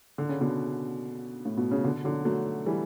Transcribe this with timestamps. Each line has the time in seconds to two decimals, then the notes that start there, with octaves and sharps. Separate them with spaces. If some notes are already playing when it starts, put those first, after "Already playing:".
0.18 D3
0.29 C#3
0.41 B2 D3
1.45 A2
1.57 B2
1.71 C#3
1.83 B2 D3
2.04 D3 F#3
2.25 F#3 A3
2.66 E3 G3